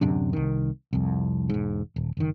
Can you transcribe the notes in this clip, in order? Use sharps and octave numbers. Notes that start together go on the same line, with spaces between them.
D1 F#2 C3 D4
C2 D#3
C2 F2
E1 G#2
D#1
F#1 D#3